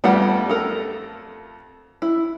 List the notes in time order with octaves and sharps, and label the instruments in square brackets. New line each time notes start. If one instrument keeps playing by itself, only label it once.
[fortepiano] F2 F3 A3 [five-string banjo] G3 B3 F#5
[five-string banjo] A4 A#4
E4